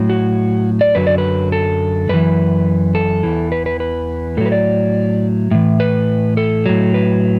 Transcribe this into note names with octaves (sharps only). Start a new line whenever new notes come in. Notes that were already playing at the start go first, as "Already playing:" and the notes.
Already playing: A2 F#3
F#4
D5
F#2 D3 F#3 B4
D5
B4
A4
F#2 E3 B4
A4
E2 E3
B4
B4
B4
A2 F#3 A4
B4
D5
A2 E3
B4
A4
A2 F#3
B4